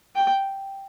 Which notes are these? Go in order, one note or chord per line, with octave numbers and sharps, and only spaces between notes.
G5